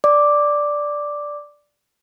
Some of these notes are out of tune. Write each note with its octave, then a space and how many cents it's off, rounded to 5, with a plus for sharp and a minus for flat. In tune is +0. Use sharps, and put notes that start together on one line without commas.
D5 +0 D6 +0